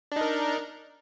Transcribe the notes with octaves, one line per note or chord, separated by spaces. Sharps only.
D4 D#4 A#4